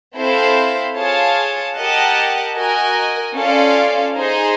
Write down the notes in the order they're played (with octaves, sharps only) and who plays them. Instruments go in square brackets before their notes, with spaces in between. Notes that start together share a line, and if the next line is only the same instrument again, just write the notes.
[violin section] C4 E4 A4 C5 F5
F4 G#4 C#5 F5 A5
G4 A#4 D#5 F#5 A5
F#4 A#4 D#5 G#5
C#4 F4 A4 D5 F5
D#4 G#4 C5